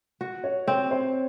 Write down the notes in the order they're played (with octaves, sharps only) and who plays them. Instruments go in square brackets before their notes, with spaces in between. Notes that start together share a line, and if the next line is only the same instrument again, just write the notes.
[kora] F#4
[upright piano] C#5
[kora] C4 [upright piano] C#5
[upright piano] C5